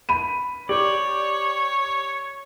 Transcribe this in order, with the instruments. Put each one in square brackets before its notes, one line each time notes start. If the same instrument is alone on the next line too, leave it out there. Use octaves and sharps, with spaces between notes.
[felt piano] B5 D#7
[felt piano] G4 [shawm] C#5 [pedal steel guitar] D5